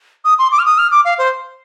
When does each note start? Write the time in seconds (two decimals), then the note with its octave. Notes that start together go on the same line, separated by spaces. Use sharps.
0.25 D#6
0.39 C6
0.52 D6
0.59 F6
0.65 D#6
0.78 F6
0.91 D6
1.05 F5
1.18 C5